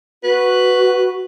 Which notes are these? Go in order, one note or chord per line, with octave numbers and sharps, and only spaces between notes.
F#4 B4